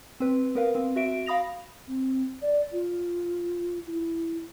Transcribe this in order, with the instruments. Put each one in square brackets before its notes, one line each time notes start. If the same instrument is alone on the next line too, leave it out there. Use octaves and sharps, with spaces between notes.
[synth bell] C4 B4
B3 A#4 B4 F5
C4
F#4 E5 D7
F5 B5 D#6 A#6 F7
[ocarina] C4
D5
F4
E4